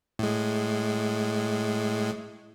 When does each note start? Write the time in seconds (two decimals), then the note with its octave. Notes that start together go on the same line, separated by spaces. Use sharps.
0.19 A2 G#3